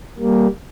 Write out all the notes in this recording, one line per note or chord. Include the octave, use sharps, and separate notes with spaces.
G3 A#3